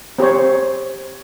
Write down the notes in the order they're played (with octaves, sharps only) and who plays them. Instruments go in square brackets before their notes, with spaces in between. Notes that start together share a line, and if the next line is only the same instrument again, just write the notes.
[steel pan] C4 G4 C5 C#5